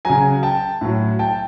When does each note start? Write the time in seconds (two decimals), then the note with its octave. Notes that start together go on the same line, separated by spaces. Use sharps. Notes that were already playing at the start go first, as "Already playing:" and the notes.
0.05 C#3 F#3 G#5 A#5
0.43 G5 A5
0.81 A2 F#3
1.19 G5 A5